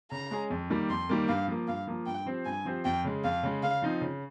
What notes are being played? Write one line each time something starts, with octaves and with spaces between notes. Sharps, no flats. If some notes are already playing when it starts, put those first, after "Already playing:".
C#3 A#5
G#3 C#4 G#4
F2
D#3 G3 A#3
F2 C6
D#3 G3 A#3
G2 F5
F3 A#3
G2 F5
F3 A#3
G2 G5
F3 C4 G4 C5
G2 G#5
F3 C4 G4 C5
F2 G5
C#3 G#3
F2 F5
C#3 G#3
C#3 F5
F3 C4 D#4
C#3